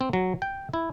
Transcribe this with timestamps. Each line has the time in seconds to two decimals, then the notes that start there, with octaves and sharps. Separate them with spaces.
0.01 C4
0.13 F#3
0.42 G5
0.73 E4